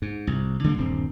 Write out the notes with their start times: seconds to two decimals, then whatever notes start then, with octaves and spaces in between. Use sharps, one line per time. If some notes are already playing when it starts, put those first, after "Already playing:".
0.02 G#2
0.27 C2
0.64 D3 G3 G#3 A#3
0.78 D#1 G2 C4